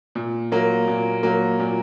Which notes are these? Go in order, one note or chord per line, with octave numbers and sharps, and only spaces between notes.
A#2
F#3 A#3
A#2
F#3 A#3
A#2